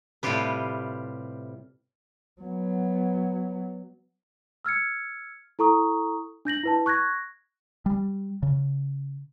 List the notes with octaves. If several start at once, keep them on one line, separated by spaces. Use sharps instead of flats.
A2 C3 G3 F4 G4 B4
F#3 B3
E6 F6 G#6 C#7
E4 A4 A#5 C#6 D#6
D4 G6 A#6 F#7
E4 B4 A5
C#6 F#6 G#6 A#6
G3
C#3